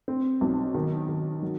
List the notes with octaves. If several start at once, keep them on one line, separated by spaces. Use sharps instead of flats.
C4
B1
D#3
D#3
F#3